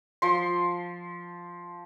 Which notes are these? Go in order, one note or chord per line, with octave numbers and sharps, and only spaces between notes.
F3 C6